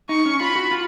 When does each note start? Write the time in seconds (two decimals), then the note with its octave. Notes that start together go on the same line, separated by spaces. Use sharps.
0.09 D#4 C#6
0.26 C#4
0.41 F4 B5
0.56 F#4
0.71 F4